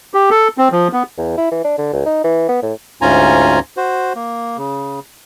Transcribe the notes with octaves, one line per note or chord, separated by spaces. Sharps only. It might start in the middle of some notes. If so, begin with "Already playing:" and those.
G4
A4
C4
F3
B3
E2
E4
E3
D4
D3
C#2
D#4
E3
B3
A2
D2 G#2 C#4 F4 G#5 A#5
F#4 C5
A#3
C#3